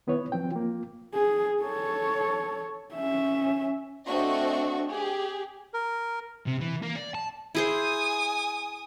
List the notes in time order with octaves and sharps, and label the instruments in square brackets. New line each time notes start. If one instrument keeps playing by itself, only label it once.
[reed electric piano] D#3 B3 E4 B4 C#5
F3 C4 G5
A#3 F4
[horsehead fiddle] G#4
A4 C#5
C#4 E5
[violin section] A3 C4 D4 F#4 D#5 C#6
G4 G#4
[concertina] A#4
[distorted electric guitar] C3
E3
A#3
D5
A5
[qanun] E4 G#4 C5 [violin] G#5 D#6